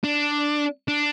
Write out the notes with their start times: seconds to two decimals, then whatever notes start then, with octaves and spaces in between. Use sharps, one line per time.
0.04 D4
0.88 D4